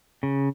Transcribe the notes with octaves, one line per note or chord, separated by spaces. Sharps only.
C#3